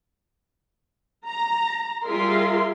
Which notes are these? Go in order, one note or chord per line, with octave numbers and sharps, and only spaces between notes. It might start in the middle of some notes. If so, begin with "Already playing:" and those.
A#5
G3 F4 G#4 A#4 E5 C6